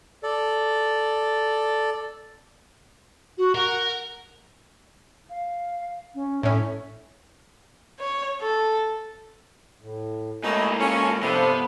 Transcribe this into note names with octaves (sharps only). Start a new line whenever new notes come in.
A4 D5
F#4
A#4 F#5
F5
C#4
A2 C#4 E5
C#5
A4
A2
G#2 A3 A#3 D#4 E4 C#5
C#4 F4 A4
G2 C3 F3 B3 A4 C5